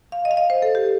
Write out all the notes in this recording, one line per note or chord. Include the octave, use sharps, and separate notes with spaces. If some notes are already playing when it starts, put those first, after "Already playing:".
F5
D#5
F5
D#5
C5
A4
G4